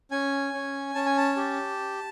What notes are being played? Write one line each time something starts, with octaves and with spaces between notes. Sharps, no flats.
C#4 G#5
C#4
C#4 A5
G#5
A5
G4